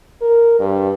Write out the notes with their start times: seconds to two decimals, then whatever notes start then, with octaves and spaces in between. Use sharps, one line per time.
0.21 A#4
0.60 G2